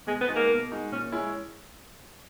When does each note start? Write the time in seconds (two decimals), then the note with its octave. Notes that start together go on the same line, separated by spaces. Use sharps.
0.07 B2 G#3
0.21 B3
0.28 G#3 D#4 F#4
0.36 A#3
0.49 B2
0.71 G#3 D#4 F#4
0.92 A#2 C#4
1.12 G#3 C#4 E4